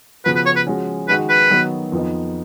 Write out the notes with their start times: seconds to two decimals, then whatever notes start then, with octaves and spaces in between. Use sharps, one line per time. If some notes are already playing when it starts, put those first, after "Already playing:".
0.24 C#3 F3 B3 F#4 B4
0.35 B4
0.46 C#5
0.56 B4
0.67 F3 G#3 C#4 F#4
1.08 D#3 G#3 D#4 F#4 B4
1.29 B4
1.50 D#3 F#3 B3 D#4 F#4
1.92 F2 F3 B3 D#4